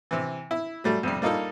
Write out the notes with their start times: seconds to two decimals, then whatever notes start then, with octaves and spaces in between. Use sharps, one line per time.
0.11 C3 E3
0.51 E4
0.84 F#3 G3 A3
1.03 F2 C3 G3
1.22 G3 A#3 D#4 F4 A4